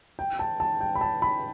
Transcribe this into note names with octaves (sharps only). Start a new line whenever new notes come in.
G5
A5
A5
G5
B5
A5
B5